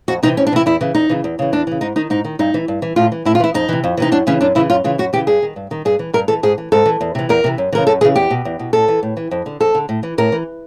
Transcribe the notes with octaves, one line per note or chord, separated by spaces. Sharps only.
F2 F#4
C3 E3 D#4
F2 C#4
D4
C3 E3 E4
E2 E4
C#3 E3
E2 D#4
C#3 E3
E2
C#3 E3
E2 D4
C#3 E3
G#2 D#4
D#3 D#4
G#2 D#4
D#3
G2 D#4
E3
G2
E3
A2 F4
E3
A2 E4
F4
E3 E4
F2 D#4
C3 E3
F2
C3 E3 D#4
F#2 D4
C#3 E3 C#4
F#2 D4
C#3 E3 E4
F#2 F4
C#3 E3 F4
F#2 F#4
C#3 E3 G4
G2 G#4
D#3
G2
D#3
G2 G#4
E3
G2 A#4
E3 A4
G#2 G#4
E3
G#2 A4
E3
E2
C3 E3
E2 A#4
C3 E3
F#2
C#3 E3 A#4
F#2 A4
C#3 E3 G#4
E2 G4
B2
E2
B2
A2 A4
E3
A2
E3
F2
D3
F2 A4
D3
A2
E3
A2 A#4
E3